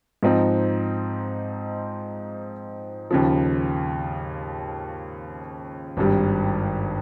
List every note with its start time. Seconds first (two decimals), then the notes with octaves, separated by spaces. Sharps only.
0.23 G#2 F3 C4 D#4
3.11 D#2 C#3 F3
5.97 G#1 G2 G3